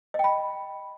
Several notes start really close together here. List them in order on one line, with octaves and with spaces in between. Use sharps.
D#5 G5 B5